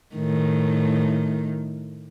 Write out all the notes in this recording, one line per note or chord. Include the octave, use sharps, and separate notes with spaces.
A2 D#3